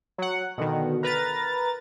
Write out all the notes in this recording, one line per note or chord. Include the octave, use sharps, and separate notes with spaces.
F#3 F#5
B2 D3 D#3
A#4 B4 A#5 A6